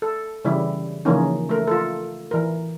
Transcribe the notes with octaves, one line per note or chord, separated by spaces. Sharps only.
A4
C#3 E3 G3 E4
C#3 E3 F3 A#3 C#4 D#4
A3 A#4
F4 A4
E3 A#4